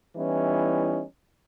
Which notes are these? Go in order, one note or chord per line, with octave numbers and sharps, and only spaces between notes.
E3 G3 B3 C#4 D#4 E4